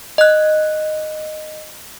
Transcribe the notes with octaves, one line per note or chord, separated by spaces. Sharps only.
D#5 F#6